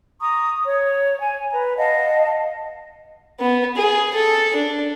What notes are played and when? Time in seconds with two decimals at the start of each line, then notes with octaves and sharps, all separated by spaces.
0.21 A#5 C#6 D#6
0.65 C#5
1.20 G#5
1.51 B4 A#5
1.78 D#5 F5 F#5 A5
3.40 B3
3.77 G#4
4.15 A4
4.56 D4